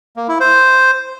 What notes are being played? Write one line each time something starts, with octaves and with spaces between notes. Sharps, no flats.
A#3
E4
C5